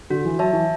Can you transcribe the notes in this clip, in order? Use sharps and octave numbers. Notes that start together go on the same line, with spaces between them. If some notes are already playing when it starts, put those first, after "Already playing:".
D3 F#4
E3
F#3 C#5 E5 A5
E3